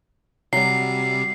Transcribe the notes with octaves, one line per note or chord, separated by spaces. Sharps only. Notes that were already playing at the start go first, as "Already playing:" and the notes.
C3 F#3 G3 C7